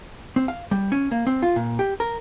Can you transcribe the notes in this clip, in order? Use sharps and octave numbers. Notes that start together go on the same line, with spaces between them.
C4
F5
G3
C#4
A#3
C4
F4
A#2
G4
A#4